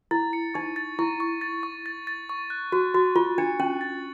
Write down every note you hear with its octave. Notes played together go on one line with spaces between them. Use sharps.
E4 A6
C#7
D#4 C#6
A6
E4 C#6
C#6
A6
C#6
A6
A6
C#6
F#6
F#4 F#6
F#4 A6
F4 F#6
D4 C#7
C#4 F#7
A6